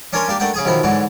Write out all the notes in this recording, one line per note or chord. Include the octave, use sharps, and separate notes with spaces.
C#4 D4 A#4 C#5 G#5 C6
A#3 D4 G4
A3 D4 A#4 F#5 G5
C#3 G#4 G#5
B1 D#3 F3 E4
G#2 D3 E3 F#3